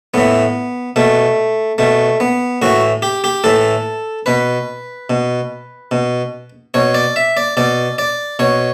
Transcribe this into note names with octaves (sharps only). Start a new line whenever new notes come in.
A2 E3 B3
B2 A3
B2 A3
B3
A2 E3 F#4
G4
G4
A2 E3 A4
B2 B4
B2
B2
B2 C#5
D5
E5
D5
B2 D5
D5
B2 C#5